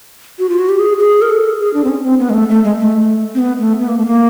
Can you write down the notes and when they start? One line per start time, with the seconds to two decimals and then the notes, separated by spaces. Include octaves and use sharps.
0.39 F#4
0.49 F4
0.59 F#4
0.69 G4
0.79 G#4
0.99 G#4
1.22 A#4
1.29 A4
1.59 G#4
1.74 D4
1.84 C4
1.89 C#4
2.04 C4
2.19 B3
2.30 G#3
2.34 A3
2.49 A3
2.64 G#3
2.79 A3
3.35 C4
3.39 B3
3.59 A3
3.80 B3
3.88 A#3
3.98 A3
4.06 A#3